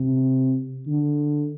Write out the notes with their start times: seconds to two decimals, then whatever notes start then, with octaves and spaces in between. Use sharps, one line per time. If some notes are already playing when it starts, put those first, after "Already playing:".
Already playing: C3
0.87 D3